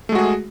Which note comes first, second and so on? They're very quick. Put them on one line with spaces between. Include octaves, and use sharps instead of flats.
A3 G#3 F#4 G#4